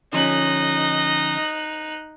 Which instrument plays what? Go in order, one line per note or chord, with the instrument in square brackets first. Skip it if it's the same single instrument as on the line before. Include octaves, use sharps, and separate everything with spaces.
[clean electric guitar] D3 F3 C#4 [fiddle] D#4 F#6 [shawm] D#5